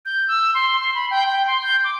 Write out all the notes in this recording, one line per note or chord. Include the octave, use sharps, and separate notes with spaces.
G6
E6
C6
C6
B5
G5
G5
C6
G6
D6